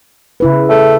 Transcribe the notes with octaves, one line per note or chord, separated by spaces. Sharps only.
C#3 E4 B4
A3